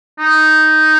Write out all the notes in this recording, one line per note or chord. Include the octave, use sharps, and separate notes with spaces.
D#4